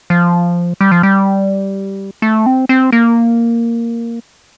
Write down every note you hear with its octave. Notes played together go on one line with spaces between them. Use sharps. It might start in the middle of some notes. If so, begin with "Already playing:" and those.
F3
G3
F3
G3
A3
C4
C4
A#3